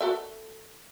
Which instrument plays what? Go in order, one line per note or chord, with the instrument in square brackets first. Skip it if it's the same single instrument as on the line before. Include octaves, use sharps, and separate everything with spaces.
[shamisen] F#4 A4 E5